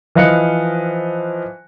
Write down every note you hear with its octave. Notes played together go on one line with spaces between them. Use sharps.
E3 F3 D#5 F5 F#6 C#7